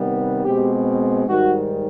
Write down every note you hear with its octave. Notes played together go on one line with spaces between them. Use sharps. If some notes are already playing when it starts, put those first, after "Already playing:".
Already playing: C3 D#3 G3 B3
B2 G#3 C4 G4
G#2 D#3 G3 F#4